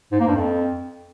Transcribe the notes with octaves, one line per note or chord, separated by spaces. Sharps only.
G#2
A#3
G2
F2